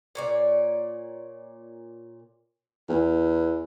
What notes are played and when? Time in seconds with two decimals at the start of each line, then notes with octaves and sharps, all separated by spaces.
0.15 A#2 C#5 D5
2.89 E2